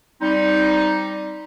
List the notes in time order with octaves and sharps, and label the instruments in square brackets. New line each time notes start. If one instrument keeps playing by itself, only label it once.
[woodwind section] G3 C4 D#4